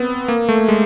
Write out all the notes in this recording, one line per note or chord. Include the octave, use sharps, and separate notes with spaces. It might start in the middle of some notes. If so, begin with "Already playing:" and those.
Already playing: B3 C4
A#3
A3
G#3